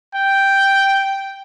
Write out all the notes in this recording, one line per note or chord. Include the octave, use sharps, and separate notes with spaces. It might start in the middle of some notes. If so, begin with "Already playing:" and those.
G5